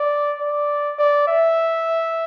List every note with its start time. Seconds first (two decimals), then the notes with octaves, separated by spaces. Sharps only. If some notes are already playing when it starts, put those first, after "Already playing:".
Already playing: D5
0.41 D5
0.98 D5
1.27 E5